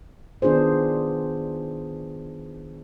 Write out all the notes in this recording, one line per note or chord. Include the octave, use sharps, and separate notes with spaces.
D#3 B3 D4 F4 G#4 C5